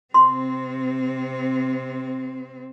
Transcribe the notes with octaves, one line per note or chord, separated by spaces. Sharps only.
C3 C4 C6